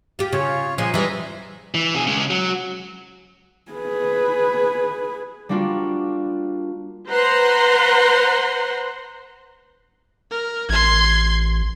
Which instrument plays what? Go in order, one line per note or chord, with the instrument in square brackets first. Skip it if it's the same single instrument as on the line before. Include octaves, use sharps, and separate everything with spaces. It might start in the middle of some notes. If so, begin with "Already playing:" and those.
[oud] F4 G4
[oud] C#3 [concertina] F4 C#5
[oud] A#2 F3 [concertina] G#3 G#5 C6
[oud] E3 G3 [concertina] G#3 A#5
[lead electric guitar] E3
B2 G#4
C#3 G#3
F#3
[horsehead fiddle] G#4 B4
[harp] G3 A#3 D4 F4 F#4
[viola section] B4 C5 F#5 A#5 C6
[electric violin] A#4
[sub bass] A1 [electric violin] C6 G#6